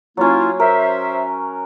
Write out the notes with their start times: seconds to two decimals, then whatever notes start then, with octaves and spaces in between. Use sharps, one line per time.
0.17 F#3 A#3 C#4 E4 F4
0.60 A#4 C5 E5